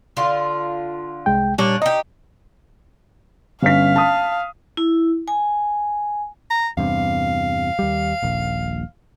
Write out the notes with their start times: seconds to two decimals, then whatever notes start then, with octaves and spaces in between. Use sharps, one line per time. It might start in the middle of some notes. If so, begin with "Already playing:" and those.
0.17 D3 F4
1.26 C2 G#3 G5
1.58 A#2 G3 A#3 C#4 D4
1.82 D#4 G4 D#5
3.63 G1 C#4 F5 B6
3.96 A5 D#6
4.77 E4
5.28 G#5
6.51 A#5
6.77 E2 G2 C3 F5
7.79 D#2 G3
8.22 D#1 A#1